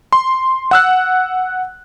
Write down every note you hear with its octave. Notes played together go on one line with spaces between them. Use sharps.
C6
F#5 E6 F#6